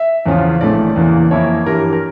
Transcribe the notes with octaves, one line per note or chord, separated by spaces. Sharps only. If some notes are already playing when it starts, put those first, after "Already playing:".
Already playing: E5
E2 C#3 F3 C#4 F4
A#1 A2 E3 A3 C#4 D5
E2 C#3 E3 A#3
F2 E3 A#3 E4 C#5
G2 E3 G3 A#4
A#4